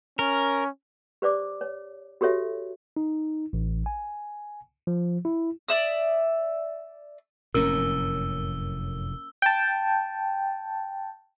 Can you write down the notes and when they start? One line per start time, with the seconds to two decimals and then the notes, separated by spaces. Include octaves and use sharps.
0.19 C#4 A#4
1.22 G4 C5 D5 D6
1.61 C#5
2.21 F#4 G4 A4 C#5 E5
2.97 D#4
3.53 A1
3.86 G#5
4.87 F3
5.25 E4
5.69 D5 E5 D#6
7.54 F1 F#2 A2 A#3 C#4 A#4 E6
9.42 G5 A5